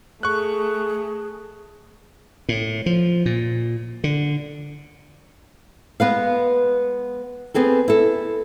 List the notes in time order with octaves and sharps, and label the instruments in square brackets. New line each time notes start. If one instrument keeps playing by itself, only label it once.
[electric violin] A3 [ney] G#4 [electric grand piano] C#6 F#6
[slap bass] A2
F3
A#2
D3
[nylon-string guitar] G#3 B3 B4 F5
B3 C4 G#4 A4
E4 A4